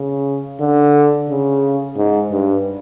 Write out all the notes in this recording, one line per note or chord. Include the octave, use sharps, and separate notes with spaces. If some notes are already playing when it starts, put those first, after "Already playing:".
Already playing: C#3
D3
C#3
G#2
G2